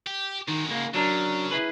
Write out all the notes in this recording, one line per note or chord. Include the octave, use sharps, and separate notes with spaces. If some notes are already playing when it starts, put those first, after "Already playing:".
G4
D#3 G#3 F#4
C#3 A#3
C#3 F#3 D4 A#4
E4 G#4 B4